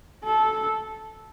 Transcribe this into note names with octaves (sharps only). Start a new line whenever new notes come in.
A4